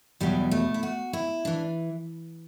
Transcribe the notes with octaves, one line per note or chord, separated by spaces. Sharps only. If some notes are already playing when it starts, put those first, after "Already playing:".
E2 B2 F#3 G3
A3
E4
F#4
E4
E3 D4